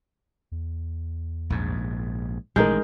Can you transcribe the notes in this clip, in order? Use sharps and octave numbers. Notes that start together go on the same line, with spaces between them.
E2
A#1 G#2
A1 A#2 D#3 G#3 D#4 A#4 G6